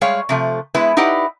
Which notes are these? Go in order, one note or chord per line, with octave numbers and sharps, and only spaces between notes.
G3 G#3 G#4 C#5 F5
C3 F3 A3
G#3 B3 E4 B4
D#4 E4 G4 B4 D5 F#5